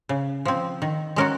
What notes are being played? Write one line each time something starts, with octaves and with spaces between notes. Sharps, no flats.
C#3
F3 C4
D#3
G#3 C#4 F#4 A#4